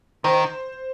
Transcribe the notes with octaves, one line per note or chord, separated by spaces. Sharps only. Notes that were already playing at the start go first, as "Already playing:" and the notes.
D#3 C5